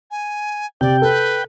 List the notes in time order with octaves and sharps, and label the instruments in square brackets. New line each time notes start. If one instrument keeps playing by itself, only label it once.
[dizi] G#5
[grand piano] C3 [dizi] D5 [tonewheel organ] G5
[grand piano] A4 [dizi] B4